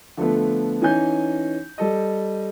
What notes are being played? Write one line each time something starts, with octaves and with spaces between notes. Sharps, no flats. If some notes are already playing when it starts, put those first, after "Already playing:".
D3 F3 A3 B3
E3 C#4 D#4 G#5 G6
G3 A4 D#5